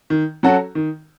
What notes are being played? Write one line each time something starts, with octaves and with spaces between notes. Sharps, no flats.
D#3
F#3 C#4 F#4 A4
D#3